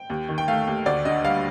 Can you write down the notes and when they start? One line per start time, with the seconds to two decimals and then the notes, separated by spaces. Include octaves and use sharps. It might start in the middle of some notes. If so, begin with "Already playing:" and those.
Already playing: G5
0.10 D#2
0.29 D#3
0.38 G5
0.48 A3 F5
0.67 D#2
0.86 D2 D5
1.05 D3 D#5
1.24 G3 F5